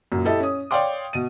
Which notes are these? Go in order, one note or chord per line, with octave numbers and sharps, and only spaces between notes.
F#2 A#2
E4 G4 A4 D#5 E5
C#4 D#6
C#5 D5 F5 G5 C6 D6
B2 D#7